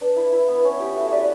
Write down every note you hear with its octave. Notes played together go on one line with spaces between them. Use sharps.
D4 B4
E4
E4
B3
C#4
E4 G4
F#4 A4 E5
G4 B4 D5